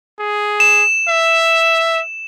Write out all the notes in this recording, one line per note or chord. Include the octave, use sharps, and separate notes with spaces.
G#4
E7
E5